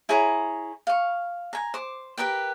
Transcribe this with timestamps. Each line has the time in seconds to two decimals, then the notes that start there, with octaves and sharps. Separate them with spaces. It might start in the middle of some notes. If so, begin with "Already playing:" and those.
0.09 E4 G#4 C#5 A#5
0.87 F5 C#6
1.53 G#5 A#5
1.74 C5 D6
2.17 G4 A#4 B4 G5